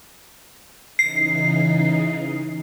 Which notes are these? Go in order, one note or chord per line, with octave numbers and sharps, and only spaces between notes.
C#3 E3 D#4 C7